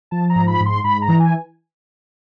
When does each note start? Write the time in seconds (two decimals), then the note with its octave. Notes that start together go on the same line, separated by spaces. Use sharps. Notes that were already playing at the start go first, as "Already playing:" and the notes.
0.11 F3 A5
0.30 A#5
0.35 G#2
0.47 B5
0.60 G#2
0.66 C6
0.84 G#2 B5
1.02 A#5
1.08 E3
1.20 G#5